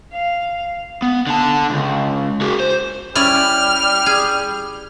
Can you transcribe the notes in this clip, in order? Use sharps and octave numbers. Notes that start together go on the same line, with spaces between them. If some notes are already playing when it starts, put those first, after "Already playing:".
F5
B3
D3 A5
C#2
F#4 G#4
C5
G3 C#4 E4 D5 F6
G#4